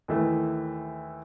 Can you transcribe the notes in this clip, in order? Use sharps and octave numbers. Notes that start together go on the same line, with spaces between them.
D#2 E3 A3